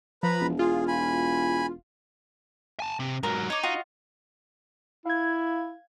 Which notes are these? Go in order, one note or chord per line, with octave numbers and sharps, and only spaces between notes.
F3 B4 A#5 B5
E1
F4 G#4
G#5 B5
G#5 A5
C3
G#2 F#3 A#4
D#4 C#5 D6
F4 F#4 D#5
E4 F5 G#6